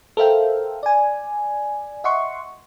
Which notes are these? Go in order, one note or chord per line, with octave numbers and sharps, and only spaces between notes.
A4 A#4 C5 E5 F5 G5
D5 G#5
D#5 E5 F#5 C6 C#6